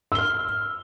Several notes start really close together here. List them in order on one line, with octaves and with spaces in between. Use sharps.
E6 G7 F6